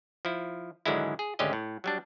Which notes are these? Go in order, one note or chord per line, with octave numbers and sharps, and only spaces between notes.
F3 E4
G#2 D3 D#3 F#3 G#3 E4
G#4
G#1 D2 D3 C#4 G4 D#5
A2
F#3 G3 D4